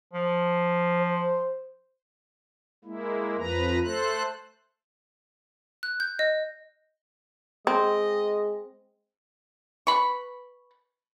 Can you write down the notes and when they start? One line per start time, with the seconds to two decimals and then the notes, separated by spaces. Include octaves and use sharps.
0.13 F3
1.00 C5
2.85 G#3 A#3 E4
3.38 F2 F3 B4 A#5
3.84 A3 A4 C5 F#6
5.83 F#6
6.00 G6
6.19 D#5
7.67 G#3 C4 D#5
9.87 B4 B5 C#6